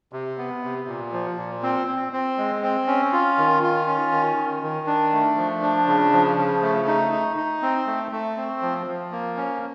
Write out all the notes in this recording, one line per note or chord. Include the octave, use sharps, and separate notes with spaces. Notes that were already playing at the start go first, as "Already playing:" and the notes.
C3
B3
C3
A#2
F3
A#2
C4
C4
C4
G#3
C4
C#4
F4
D#3
F4
C#4
D#3
D#3
D#3
D4
A3
F3
D4
C#3
F3
C#3
A3
D#4
D#4
D#4
C4
A3
A3
C4
F3
F3
A#3
C#4